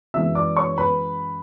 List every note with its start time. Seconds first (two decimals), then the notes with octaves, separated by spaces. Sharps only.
0.14 F#2 E3 G#3 E5 E6
0.35 D5 D6
0.57 C#5 C#6
0.78 B4 B5